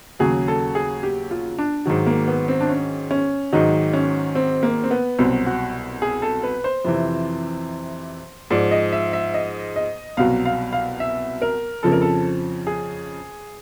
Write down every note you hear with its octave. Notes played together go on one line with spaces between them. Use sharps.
D#2 C#3 F#3 G#4
A4
G#4
G4
F4
D4
G#2 D#3 F#3
A#3
B3
C4
D4
C#4
C#4
G#2 D#3 F#3 D#4
C#4
C4
A#3
C4
B3
C2 B2 F#3 C4
F#4
G#4
A4
B4
C5
F2 C3 E3
G#2 F3 D5
D#5
E5
E5
D#5
D#5
C2 B2 F#3 F5
F5
F5
E5
A#4
F2 C#3 F3 A4
A#4
A4
G#4